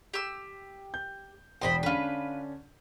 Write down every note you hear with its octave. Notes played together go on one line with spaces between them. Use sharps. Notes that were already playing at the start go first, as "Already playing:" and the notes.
G4 E6
G6
E1 E2 C5 D#5 G5 B5
D3 C#4 D4 F4 B4